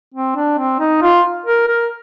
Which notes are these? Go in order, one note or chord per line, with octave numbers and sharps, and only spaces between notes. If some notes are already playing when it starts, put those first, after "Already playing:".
C4
D4
C4
D#4
F4
A#4
A#4